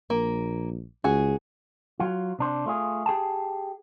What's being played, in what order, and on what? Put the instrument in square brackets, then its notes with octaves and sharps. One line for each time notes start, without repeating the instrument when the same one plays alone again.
[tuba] A#1 [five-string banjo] A#3
[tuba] C#2 [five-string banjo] F#4 G#4
[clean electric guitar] F#3 F4
C3 D4 C5
A3 F4 G#4
G4 G#4 G5 A5